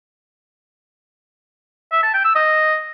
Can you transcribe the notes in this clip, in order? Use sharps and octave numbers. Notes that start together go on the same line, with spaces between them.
E5
A5
G5
E6
D#5